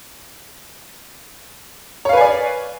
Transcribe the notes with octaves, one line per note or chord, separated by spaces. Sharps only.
B4 C#5 D5 F5 G#5